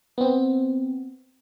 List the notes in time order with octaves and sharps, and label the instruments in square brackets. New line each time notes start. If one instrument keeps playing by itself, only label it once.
[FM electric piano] B3 C4